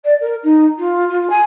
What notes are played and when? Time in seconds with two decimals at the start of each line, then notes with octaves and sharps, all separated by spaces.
0.04 D5
0.21 A#4
0.43 D#4
0.78 F4
1.09 F4
1.29 G#5